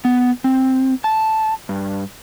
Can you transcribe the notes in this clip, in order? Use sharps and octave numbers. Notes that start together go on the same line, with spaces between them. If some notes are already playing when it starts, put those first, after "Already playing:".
B3
C4
A5
G2